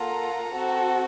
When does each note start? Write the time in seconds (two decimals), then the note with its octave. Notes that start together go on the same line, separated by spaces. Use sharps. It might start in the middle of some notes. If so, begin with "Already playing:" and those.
Already playing: A#3 F4 A4 F#5 A#5
0.53 C4 F#4 A4